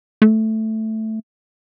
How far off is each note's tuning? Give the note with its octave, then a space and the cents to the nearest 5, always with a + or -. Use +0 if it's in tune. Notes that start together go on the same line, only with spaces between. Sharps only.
A3 +0